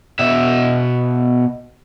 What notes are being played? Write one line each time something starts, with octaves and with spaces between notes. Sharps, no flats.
B2 E5